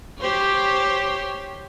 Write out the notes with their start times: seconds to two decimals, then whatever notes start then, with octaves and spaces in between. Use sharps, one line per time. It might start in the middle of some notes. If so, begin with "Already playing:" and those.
0.19 G4 C5 C#5